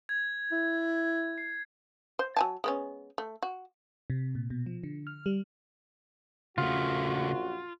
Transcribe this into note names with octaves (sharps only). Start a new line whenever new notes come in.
G#6
E4
C7
C5
F#3 G#5 A5
G#3 B3 C#4
A3
F#4
C3
A#2
B2
F3
D3
F6
G3
A#1 F#2 C#3 A3 F4 F#4